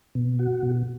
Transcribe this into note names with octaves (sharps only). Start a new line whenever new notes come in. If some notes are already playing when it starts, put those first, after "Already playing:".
B2
F#4
B2